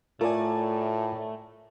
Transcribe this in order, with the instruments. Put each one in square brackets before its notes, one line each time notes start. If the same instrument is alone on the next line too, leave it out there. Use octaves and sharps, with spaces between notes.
[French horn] A2 [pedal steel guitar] A3 [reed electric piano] F4 [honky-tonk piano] A#4 D5 G#5